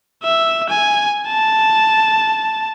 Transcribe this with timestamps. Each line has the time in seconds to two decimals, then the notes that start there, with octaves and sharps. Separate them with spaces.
0.23 E5
0.69 G#5
1.28 A5